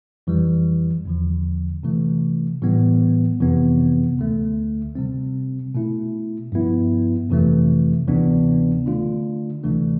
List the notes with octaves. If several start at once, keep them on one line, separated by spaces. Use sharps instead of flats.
F2 E3 G3
E2 D3 F3
C3 E3 A3
A2 E3 G3 B3
F2 C3 E3 B3
D2 D3 A3
C3 G3 C4
B2 A3 E4
G2 F3 B3 E4
F2 C3 E3 A3
D2 C3 E3 B3 D4
D3 A3 D4 F4
D2 C3 E3 A3 D4